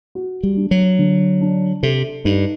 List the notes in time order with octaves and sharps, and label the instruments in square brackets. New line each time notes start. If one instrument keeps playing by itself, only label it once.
[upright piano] F#4
[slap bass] G3
[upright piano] D4
[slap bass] F#3
[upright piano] D3
D4
[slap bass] C3 [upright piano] A4
[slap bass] G2 [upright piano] D#4